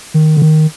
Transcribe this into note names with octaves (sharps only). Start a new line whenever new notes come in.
D#3
D3
D#3